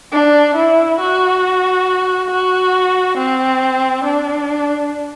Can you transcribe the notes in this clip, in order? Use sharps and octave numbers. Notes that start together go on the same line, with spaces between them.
D4
E4
F#4
F#4
C4
D4